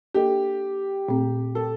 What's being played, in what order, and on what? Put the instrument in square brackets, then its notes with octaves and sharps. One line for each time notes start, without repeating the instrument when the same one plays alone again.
[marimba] A#3 D4 A4 D#5 [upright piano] G4
[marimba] A#2 A3 C4
[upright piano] A4